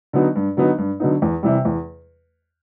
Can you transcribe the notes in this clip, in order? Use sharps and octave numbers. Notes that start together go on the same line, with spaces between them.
D3 F#3 B3 D#4
G2
D3 F#3 B3 D#4
G2
D3 F#3 B3 D#4
E2
C3 E3 G3
E2